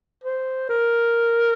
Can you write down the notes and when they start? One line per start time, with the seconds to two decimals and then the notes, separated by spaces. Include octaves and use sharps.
0.24 C5
0.69 A#4